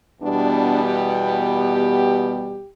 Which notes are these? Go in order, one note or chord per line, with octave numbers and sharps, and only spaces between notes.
E2 B2 G3 B3 D4
G4